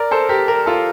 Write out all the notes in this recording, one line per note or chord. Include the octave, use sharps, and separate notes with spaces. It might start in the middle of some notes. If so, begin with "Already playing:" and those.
Already playing: A#4 D5
A4 C5
G4 A#4
G4 A#4
F4 A4